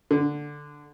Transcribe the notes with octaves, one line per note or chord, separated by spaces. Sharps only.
D3